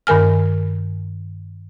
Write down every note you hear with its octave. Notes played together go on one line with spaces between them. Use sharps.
G2 D#3 A#4 G#5 F6